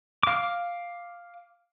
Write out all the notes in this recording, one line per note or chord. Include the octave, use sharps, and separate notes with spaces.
F5 D6